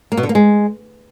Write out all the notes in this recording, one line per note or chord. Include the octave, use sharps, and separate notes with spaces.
A#3
B2
D3
A#3
G#3